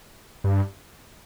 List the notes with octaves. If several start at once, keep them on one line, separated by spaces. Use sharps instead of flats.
G2